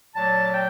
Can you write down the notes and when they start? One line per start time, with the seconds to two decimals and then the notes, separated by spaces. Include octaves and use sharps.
0.16 A#2 F#3 A3 A5
0.53 G5